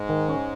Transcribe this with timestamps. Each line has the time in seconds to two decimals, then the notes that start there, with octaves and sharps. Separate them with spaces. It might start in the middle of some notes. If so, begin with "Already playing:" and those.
Already playing: G#2 G#3
0.09 D#3
0.29 C#4